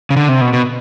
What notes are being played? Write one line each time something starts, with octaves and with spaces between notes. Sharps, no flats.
C#3
D3
C3
B2
B2